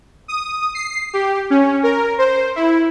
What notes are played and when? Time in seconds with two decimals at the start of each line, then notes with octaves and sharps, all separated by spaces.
0.28 D#6
0.75 C7
1.13 G4
1.50 C#4
1.83 A#4
2.18 C5
2.56 E4